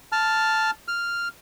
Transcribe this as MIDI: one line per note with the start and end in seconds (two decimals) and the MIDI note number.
0.12 0.71 81
0.12 0.71 89
0.88 1.28 89